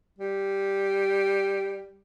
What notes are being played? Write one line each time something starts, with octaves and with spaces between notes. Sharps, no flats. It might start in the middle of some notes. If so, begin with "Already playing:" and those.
G3